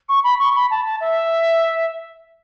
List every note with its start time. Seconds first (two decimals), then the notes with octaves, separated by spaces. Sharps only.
0.09 C#6
0.24 B5
0.39 C#6
0.55 B5
0.70 A5
0.85 A5
1.00 E5